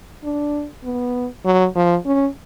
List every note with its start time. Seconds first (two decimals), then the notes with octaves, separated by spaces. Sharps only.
0.24 D4
0.84 B3
1.45 F#3
1.75 F3
2.06 C#4